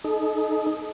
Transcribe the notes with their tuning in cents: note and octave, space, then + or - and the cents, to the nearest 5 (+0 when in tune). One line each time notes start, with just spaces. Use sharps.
D#4 +0 A4 -40